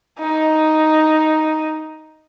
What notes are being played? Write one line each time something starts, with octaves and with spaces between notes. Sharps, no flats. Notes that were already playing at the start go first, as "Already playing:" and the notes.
D#4